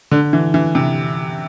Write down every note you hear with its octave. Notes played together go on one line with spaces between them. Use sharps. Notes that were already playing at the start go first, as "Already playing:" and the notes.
D3
E3
E3
C3